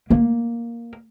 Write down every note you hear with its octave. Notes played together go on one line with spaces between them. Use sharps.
A#3